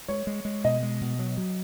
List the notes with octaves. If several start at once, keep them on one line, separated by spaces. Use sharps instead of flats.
G#3 C#5
G#3
G#3
B2 D#5
G#3
B2
F#3
F#3